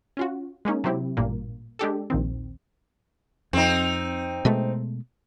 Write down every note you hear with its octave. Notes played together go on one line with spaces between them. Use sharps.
C#4 F4 F#4
G#3 A#3 C#4 D#4
C3 F#3 C4 E4 G4
A1 G2 A#2 A#3
G#3 D4 G4 A4
A#1 D#2 D#3 C4
F2 C4 D#4
B2 G#3 A3